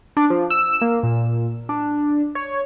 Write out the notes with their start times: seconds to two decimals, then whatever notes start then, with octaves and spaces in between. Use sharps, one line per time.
0.17 D4
0.30 F3
0.50 E6
0.81 A#3
1.03 A#2
1.69 D4
2.35 C#5